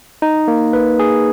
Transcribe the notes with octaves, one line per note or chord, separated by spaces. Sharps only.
D#4
A#3
B4
G#4